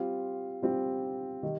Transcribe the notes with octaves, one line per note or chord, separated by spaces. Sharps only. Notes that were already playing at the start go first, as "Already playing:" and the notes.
Already playing: G3 C4 F4
G3 C4 F4
D#3 G3